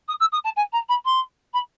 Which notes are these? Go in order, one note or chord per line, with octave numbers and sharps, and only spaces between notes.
D#6
E6
D#6
A5
G#5
A#5
B5
C6
B5